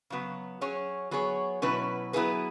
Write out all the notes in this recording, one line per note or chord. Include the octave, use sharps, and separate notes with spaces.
C#3 F#3 B3
F#3 C#4 G#4 C#5
F#3 B3 G#4 C#5
B2 F#3 C#4 E4 B4
F#3 B3 E4 G#4 B4